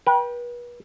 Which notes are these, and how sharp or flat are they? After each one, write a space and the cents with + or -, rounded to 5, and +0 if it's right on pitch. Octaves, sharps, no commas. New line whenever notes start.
B4 -35 G5 +0